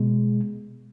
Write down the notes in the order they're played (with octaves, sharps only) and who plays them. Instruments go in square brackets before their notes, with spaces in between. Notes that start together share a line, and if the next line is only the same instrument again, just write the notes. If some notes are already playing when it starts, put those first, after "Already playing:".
Already playing: [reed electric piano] B2 G#3